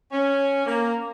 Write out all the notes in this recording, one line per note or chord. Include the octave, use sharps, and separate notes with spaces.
C#4
A#3